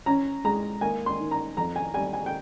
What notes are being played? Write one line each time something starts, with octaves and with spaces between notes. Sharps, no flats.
C#4 A#5
G#3 A#5
A#3 G#5
C6
D#3
A#5
F2 A#5
G#5
G3 G#5
G#5
G5